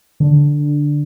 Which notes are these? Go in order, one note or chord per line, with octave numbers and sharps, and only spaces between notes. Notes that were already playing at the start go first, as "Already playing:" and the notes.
D3